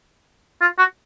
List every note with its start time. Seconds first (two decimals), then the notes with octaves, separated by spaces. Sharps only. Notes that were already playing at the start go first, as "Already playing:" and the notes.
0.61 F4
0.79 F#4